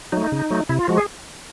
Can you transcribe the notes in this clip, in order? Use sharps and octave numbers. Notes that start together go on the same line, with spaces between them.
F#3 A3 D#4
C#3
F#3 A3
C3 E4
F4
F3 G#3 F#4
G#4